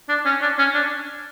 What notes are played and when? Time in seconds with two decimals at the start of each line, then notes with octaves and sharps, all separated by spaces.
0.09 D4
0.26 C#4
0.42 D4
0.59 C#4
0.75 D4